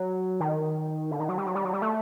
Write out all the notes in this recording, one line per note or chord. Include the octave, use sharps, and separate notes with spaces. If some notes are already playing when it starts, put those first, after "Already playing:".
Already playing: F#3
D#3
D3
D#3
F#3
G3
F#3
G3
F#3
G3
A3